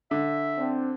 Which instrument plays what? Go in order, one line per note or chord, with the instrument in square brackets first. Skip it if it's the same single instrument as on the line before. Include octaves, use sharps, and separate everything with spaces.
[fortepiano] D3 [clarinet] E5
[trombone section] C4 D4